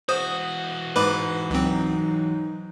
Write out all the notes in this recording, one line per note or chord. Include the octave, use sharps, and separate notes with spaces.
E3 F#4 C5 D#6
G#2 B4 B5 D6
C#2 F#3 C4 D#4